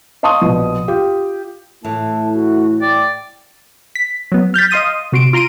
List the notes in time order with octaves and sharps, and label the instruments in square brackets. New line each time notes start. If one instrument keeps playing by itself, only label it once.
[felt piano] D#5 F5 A5 C6 C#6 D#6
A#1 B2
F4 G4
[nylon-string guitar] A2 E3 [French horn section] A3 E4 [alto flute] A5
[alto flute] F#4
[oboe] D5 [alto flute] G5
[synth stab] B6
F#3 B3
F6 G6 A6 B6
D#5 F5 C6 D#6 D#7
C3 F#4 C6 D7
F4 A#5 C6 D7 D#7